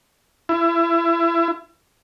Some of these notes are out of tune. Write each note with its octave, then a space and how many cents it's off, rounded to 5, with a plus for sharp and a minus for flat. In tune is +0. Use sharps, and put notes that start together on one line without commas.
E4 +30